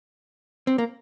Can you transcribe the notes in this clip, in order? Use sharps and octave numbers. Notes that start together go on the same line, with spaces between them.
C4
A#3